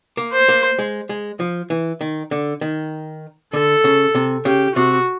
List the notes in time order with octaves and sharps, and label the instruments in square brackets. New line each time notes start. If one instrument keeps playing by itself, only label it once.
[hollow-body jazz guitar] A#3
[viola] C5
[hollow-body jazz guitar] A#3
G#3
G#3
F3
E3
D#3
D3
D#3
[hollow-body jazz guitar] D3 [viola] A4
[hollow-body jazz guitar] C#3
C3
[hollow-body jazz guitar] C#3 [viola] G4
[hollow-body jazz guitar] C3 [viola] F#4